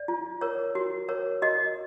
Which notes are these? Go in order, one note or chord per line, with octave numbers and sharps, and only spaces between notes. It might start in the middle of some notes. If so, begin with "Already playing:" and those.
Already playing: D5
F4
A#4 C#5
F#4
A#4 C#5
F#4 D#5